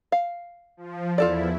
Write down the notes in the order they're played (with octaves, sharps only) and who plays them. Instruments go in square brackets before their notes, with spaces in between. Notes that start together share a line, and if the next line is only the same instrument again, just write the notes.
[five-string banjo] F5
[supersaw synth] F3
[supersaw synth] E2 E4 [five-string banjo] F4 A4 D5